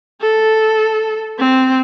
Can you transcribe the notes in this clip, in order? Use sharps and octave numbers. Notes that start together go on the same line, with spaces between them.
A4
C4